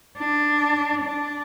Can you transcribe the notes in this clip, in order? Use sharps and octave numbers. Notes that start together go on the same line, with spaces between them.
D4
D4